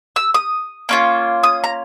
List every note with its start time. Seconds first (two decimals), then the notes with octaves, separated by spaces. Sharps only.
0.16 E6
0.34 D#6
0.89 A#3 C#4 F4
1.43 D#6
1.64 A#5